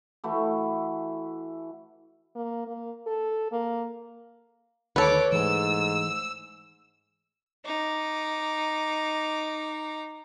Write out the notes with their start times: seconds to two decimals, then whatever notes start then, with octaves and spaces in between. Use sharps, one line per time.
0.24 E3 A3 E4 F#4
2.35 A#3
2.67 A#3
3.07 A4
3.52 A#3
4.96 D2 D#3 A4 B4 C#5 D6
5.33 G#2 E3 A3 E6
7.65 D#4 D6